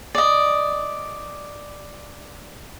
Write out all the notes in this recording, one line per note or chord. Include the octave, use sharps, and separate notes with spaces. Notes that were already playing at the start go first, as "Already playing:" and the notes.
D5 D#5